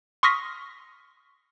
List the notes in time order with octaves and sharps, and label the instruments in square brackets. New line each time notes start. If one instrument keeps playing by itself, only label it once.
[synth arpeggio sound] C6 C#6 D#6 F6 A#6 B6